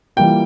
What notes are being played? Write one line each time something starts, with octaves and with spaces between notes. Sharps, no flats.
E3 G3 A#3 F4 G5